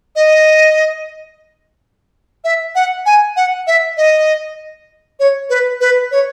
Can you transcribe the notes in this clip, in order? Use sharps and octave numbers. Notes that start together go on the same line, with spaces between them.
D#5
E5
F#5
G#5
F#5
E5
D#5
C#5
B4
B4
C#5